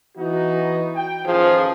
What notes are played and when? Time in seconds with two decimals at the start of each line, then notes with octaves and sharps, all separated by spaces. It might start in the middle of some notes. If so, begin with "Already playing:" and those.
0.17 E3 B3 D#4 F#4
0.96 G5
1.26 A1 D#3 F3 G#4